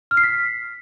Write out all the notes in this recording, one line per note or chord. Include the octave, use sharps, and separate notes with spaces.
F6
C7
B6